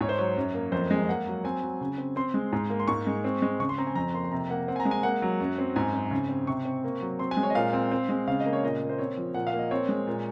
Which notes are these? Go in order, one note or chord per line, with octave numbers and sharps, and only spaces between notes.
G#2 C#5
C5
F#3 C#5
F#2
A#3
F2 C5
G#3
A#3 F#5
F#3
C4 G#5
F#3
C#3
C4
C4 C6
G#3
G#2
A#3
C6
G#2 C#6
G#3
C4
G#3
C#3 C#6
C6
C4 A#5
G#5
F2 A#5
A#3 C6
C6
C3 A#5
A#3 F#5
C4 F#5
G#5
A#5
G#3
G#5
A#3 F#5
F#3
F#2
C4
G#2 G#5
C4
C#3
C4
C3 C#6
C4
A#3
F#3
C4 C6
G#5
G#3
C#5
D#5
A#2 F5
C4
C4
G#3
C#3 F5
D#5
A#3
C#5
A#2 D#5
A#3
C5
C4 C#5
F3
A#2 F#5
F5
A#3
D#5
C4 C#5
G#3
A#2